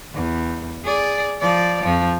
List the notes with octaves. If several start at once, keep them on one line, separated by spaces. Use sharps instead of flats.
E2
G#4 D5
F3 D5
F2 F3